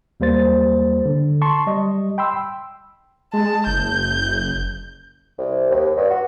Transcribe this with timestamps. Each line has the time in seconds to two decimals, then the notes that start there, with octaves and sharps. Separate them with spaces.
0.20 D#2 G3 A#3 C5 A6
1.05 D3
1.42 A5 C6 C#6
1.67 G3 D#5
2.18 G5 B5 C6 E6
3.33 G#3 A5
3.67 F#1 G6
5.38 C2
5.70 D#2
5.97 G2
6.10 F#4